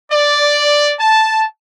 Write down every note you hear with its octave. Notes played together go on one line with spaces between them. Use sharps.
D5
A5